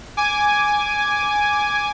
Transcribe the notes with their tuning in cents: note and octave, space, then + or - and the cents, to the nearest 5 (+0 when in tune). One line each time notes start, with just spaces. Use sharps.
G#5 +0 D6 -5